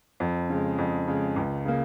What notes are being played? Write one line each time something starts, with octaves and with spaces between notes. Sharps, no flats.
F2
C#3 G#3
F2
C#3 G#3
C#2
C#3 A#3